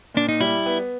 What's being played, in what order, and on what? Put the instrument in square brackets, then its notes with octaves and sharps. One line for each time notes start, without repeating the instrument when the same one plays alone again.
[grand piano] A#2 [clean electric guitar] D4
[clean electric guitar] D#4
[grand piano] G3 [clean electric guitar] E4
[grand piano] B3